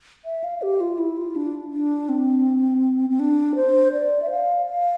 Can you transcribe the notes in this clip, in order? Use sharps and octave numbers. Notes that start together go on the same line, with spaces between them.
E5
F5
G4
F4
E4
F4
D4
D4
C4
C4
D4
C5
D5
E5
F5
F5